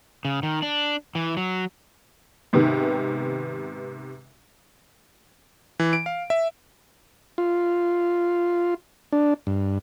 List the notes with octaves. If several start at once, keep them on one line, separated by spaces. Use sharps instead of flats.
C#3
D#3
D4
E3
F#3
G#2 C3 D#3 B3
E3
D7
F5
E5
F4
D4
G2